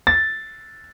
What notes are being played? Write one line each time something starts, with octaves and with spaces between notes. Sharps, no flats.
A6